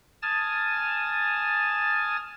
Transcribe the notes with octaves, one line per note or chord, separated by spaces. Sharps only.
G#5 A5 D#6 F6 A6